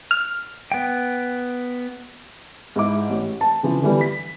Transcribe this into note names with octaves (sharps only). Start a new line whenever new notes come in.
F6
B3 G5
G#2 E4 D6
A1
A5
C#3 E3 F3
D3 E3 F3 G3 B3
B6